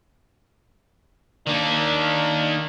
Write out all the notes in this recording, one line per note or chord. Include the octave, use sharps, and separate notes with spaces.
D#3 A#3 D4